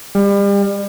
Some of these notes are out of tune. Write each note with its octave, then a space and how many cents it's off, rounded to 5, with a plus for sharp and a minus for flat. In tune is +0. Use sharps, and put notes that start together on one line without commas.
G3 +35